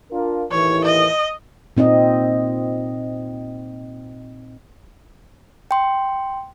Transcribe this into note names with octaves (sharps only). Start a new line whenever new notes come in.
D4 F4 A#4
D#2 A2 E3 C#5
D#5
A#2 C4 D#4 D#5
G5 C6